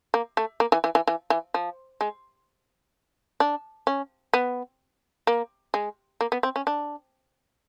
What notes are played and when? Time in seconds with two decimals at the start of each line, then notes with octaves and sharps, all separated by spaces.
0.14 A#3
0.37 A3
0.60 A#3
0.72 E3
0.84 E3
0.95 E3
1.07 E3
1.30 E3
1.54 F3
2.01 G#3
3.40 D4
3.87 C#4
4.33 B3
5.27 A#3
5.74 G#3
6.21 A#3
6.32 B3
6.43 C4
6.56 C#4
6.67 D4